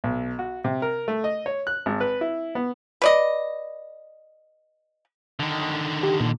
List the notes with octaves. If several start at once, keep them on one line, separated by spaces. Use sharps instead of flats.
B1
F#4
C3
A#4
A3
D#5
C#5
F#6
G#1
B4
E4
B3
B4 D5 D#5
D3 D#3
G4
A#2